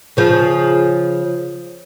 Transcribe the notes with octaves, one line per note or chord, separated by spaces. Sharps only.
C#3 F3